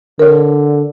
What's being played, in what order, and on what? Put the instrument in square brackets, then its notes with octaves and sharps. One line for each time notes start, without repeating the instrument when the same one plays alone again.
[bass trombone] D3 [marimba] A#4 C#5